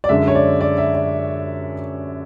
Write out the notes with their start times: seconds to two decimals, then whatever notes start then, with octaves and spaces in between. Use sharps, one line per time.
0.04 D5
0.09 F#2 D3 G#3 E5
0.28 C#5
0.35 D5
0.61 D5
0.78 E5
0.94 D5